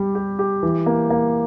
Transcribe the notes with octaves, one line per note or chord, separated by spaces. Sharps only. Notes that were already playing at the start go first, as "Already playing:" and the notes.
Already playing: G3 G4
G4
G4
E3
A#3
A#3